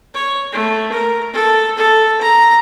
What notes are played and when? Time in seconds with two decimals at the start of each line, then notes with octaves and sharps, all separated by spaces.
0.14 C#5
0.52 A3
0.92 A#4
1.33 A4
1.77 A4
2.21 A#5